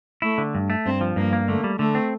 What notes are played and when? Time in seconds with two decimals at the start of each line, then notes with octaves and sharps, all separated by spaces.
0.22 A3 E4
0.38 D3
0.55 G2
0.70 A3
0.85 G2 C4
1.01 F3
1.16 G2 A#3
1.33 A#3
1.47 D3 A3
1.64 G3
1.79 D3 A3
1.95 C4